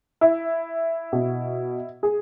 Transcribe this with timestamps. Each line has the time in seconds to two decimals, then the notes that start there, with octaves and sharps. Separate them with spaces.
0.21 E4
1.13 B2
2.03 G#4